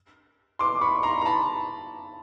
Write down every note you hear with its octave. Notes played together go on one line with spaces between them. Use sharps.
C6 D6
B5 C#6
A#5 C6
A#5
A5 B5